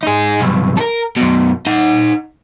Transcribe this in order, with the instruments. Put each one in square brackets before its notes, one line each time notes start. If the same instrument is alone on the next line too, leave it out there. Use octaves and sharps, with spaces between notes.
[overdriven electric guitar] D#4 G#4
B1 G2
A4 A#4
F#2 B2
D#4 F#5